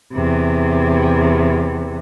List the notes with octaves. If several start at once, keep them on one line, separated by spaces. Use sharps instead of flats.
E2 C3